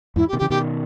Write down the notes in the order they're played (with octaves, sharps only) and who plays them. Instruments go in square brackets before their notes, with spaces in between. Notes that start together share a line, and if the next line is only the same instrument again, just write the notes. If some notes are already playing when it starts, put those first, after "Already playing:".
[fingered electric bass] E2 G#2 [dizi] E4
[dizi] G4
[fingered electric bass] B2 D#3
[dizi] G4
[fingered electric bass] C#3 E3
[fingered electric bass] B2 D#3 [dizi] G4